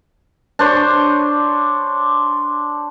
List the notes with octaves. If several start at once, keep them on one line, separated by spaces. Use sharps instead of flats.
D4 C5 C#5